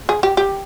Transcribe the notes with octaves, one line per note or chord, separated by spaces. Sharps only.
G#4
G4
G4